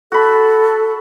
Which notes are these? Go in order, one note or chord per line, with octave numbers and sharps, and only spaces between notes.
F#4 A4 B5